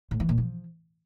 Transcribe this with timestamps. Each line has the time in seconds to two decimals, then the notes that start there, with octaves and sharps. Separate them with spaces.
0.11 A2
0.20 E3
0.29 A#2
0.38 F3